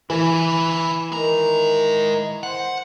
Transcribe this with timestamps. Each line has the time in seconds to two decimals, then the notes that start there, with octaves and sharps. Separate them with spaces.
0.10 E3 E4 G#5
1.12 D#3 G#3 A#5
2.43 C5 F#5